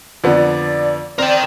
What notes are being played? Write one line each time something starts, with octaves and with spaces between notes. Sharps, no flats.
F2 D3 B3 D5
C4 A#4 D5 G5